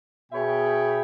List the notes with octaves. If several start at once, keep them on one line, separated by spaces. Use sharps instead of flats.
B2 G#4 C#5 E5 G5 B5